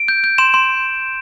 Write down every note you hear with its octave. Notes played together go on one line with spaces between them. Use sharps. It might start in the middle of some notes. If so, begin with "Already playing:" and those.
Already playing: D7
G6
G6
C6 E7
C6